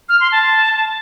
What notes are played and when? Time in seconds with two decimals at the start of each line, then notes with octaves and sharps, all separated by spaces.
0.09 F6
0.20 C6
0.32 A5